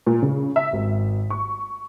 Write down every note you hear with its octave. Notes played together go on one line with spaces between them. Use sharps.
A#2
C#3
E5
G#1
C#6